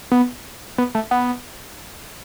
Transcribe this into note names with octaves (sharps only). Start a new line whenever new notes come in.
B3
B3
A3
B3